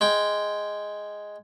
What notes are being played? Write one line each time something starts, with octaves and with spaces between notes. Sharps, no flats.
G#3 G5